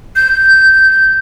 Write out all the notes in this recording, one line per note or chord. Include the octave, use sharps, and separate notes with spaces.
G6